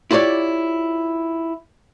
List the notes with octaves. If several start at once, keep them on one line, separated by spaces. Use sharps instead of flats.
E4 F4 G4 C#5 D5